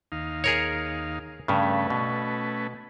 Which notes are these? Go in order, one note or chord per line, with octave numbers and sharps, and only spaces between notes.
D#2 D#4 F5
G#4 A#4 C#5
G2 C#3 A3 C#4 B4
B2